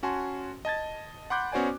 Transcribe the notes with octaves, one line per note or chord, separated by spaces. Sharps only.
C#4 F#4 G#5 A5 C6
D#5 A5 G#6 A6
F#5 B5 C6 D6 F#6 G6
B3 C#4 F#4 C5 D5 G#5